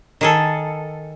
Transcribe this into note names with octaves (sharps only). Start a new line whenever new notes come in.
D#3 G#4 A4